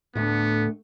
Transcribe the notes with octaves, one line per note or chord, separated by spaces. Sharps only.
D2 A2 A3 B3 D4